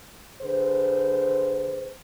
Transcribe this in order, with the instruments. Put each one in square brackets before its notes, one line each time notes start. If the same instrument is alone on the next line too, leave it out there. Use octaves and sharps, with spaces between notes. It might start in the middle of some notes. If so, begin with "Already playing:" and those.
[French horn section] D3 G#4 B4 C5